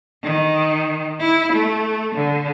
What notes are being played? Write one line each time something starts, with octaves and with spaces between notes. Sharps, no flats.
D#3
E4
A3
D3